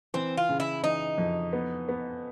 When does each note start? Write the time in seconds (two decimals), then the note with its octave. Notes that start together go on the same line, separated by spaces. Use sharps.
0.14 E3 C4
0.37 F4
0.49 C#3
0.60 E4
0.84 E3 D#4
1.18 F2
1.53 B3
1.89 B3